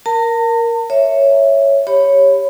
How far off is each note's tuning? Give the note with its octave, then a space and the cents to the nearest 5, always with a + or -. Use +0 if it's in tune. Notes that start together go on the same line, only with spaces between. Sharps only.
A#4 +5 A5 +45
C#5 +0 E5 +0
G4 +10 C#5 +0 B5 +10